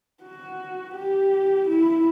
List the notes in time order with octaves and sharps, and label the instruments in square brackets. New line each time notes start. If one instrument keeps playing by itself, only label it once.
[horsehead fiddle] F#4
G4
E4